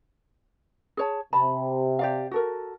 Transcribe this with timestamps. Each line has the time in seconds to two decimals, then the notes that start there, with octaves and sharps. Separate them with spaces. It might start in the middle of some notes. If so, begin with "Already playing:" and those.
0.97 G#4 C#5 A5
1.33 C3 A5 B5
1.99 G4 D5 F5
2.31 F#4 A4 A#4